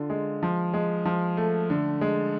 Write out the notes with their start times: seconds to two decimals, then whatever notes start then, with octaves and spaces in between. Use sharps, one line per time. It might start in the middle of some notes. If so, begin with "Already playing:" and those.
Already playing: D3 F4
0.10 G#3
0.43 F3
0.74 G#3
1.05 F3
1.37 A3
1.70 D3
2.01 G#3